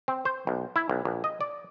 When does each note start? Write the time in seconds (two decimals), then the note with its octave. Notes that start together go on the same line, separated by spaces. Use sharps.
0.08 C4
0.25 C5
0.47 B1
0.76 E4
0.89 B1
1.05 A#1
1.24 D#5
1.41 D5